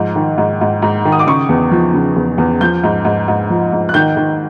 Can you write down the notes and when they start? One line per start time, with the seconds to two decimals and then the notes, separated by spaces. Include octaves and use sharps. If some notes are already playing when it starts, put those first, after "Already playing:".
Already playing: G#2 F3
0.16 D#3
0.38 G#2
0.61 G#2
0.82 G#2
1.05 D#3
1.12 D#6
1.19 D6
1.27 C#3 C#6
1.49 E2
1.71 F3
1.94 C#3
2.16 E2
2.38 E2
2.61 F3 G6
2.83 G#2
3.05 G#2
3.28 G#2
3.50 F3
3.72 G#2
3.89 F#6
3.94 D#3 G6
4.17 D#3